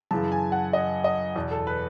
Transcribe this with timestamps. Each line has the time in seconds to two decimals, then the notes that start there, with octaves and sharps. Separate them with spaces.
0.11 F#2 C#3 E3 A5
0.32 G#5
0.52 F#5
0.73 D#5
1.04 D#5
1.36 E2 B2
1.51 A4
1.67 B4